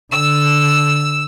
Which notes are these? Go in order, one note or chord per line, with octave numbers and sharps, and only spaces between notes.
D3 E6